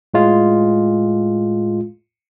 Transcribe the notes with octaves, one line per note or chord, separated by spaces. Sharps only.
A2 G#3 F4